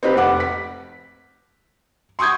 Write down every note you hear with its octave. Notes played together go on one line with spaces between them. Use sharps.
C4 D#4 G4 B4
F1 B4 F#5 D6
B6
C6 C#6 D#6 G6 G#6